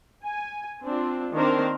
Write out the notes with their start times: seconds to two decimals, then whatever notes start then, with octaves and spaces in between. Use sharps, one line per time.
0.24 G#5
0.82 C4 D4 F4
1.33 D#3 A#3 C4 D4 A#4 C5